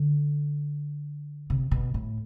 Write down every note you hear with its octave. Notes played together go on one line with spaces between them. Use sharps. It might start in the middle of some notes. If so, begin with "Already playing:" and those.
Already playing: D3
C3
B2
A2